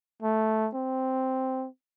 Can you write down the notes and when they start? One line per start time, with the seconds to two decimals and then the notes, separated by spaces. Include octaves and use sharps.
0.22 A3
0.74 C4